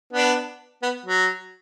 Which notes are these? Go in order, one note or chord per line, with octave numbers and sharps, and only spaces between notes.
B3 D4
B3
F#3